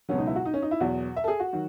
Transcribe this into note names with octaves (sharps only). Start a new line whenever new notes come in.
C#2 B2 F#3 C#4
D#4
E4
F#4
D#4
C#4
D#4
E4
E2 B2 F#3 F#4
E5
A4
G#4
F#4
D#3 F#3